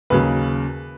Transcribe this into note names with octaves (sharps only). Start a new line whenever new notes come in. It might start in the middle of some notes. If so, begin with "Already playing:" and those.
D#2 C#3 F#3 B4